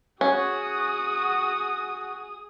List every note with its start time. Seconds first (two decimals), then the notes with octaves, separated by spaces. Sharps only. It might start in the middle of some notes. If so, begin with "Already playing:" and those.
0.21 C#4 F#4 G#4 D#6